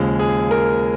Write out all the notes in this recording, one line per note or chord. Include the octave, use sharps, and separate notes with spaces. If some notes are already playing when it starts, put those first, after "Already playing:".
Already playing: D#2 C#3 F3 G#3
G#4
A#4